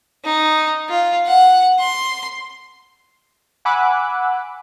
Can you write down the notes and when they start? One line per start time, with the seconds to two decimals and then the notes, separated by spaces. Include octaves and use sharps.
0.25 D#4
0.89 F4
1.26 F#5
1.79 C6
3.65 F#5 G#5 B5 D6 E6 F#6